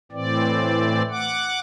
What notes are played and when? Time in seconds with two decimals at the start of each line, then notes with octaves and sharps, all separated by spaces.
0.12 A2 E3 C4 D5
1.10 F#5 D6